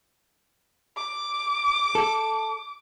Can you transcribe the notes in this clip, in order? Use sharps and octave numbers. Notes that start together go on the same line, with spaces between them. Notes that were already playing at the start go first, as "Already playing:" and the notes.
D6
A4